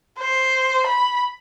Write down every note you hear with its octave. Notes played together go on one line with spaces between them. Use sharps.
C5
B5